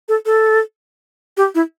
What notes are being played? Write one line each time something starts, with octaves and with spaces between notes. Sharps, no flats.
A4
A4
G4
E4